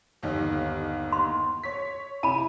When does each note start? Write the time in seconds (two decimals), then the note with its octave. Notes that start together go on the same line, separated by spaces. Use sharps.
0.23 G1 D#2 D#4
1.12 C6
1.64 C#5 B6
2.23 C3 E4 G#5 B5 D#7